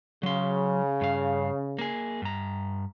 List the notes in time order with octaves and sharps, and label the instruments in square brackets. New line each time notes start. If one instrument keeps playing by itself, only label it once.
[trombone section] C#3 [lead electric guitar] F#3 C6
[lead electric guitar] G2 F5
A#3 G#4
G2 A#5